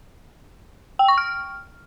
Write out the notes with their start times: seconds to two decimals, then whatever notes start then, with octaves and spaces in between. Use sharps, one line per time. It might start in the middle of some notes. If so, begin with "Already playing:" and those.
0.99 G5
1.08 C#6
1.18 F6